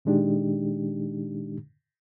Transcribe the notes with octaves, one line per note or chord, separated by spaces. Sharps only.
A#2 D#3 G#3 D4 D#4 G4